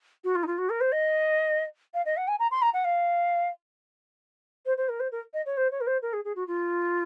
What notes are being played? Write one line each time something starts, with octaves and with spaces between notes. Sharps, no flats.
F#4
F4
D#4
F4
F#4
A#4
C5
D#5
F5
D#5
F#5
G#5
A#5
C6
A#5
F#5
F5
C5
C5
A#4
C5
A#4
D#5
C#5
C5
C#5
A#4
C5
A#4
G#4
G#4
F#4
F4